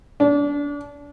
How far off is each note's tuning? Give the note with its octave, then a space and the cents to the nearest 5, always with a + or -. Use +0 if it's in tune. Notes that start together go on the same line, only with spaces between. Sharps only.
D4 -30